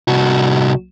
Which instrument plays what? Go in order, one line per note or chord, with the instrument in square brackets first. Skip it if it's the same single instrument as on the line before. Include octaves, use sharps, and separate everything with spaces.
[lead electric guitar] C2 F#4